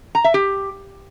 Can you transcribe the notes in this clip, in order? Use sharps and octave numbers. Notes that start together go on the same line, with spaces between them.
A#5
E5
G4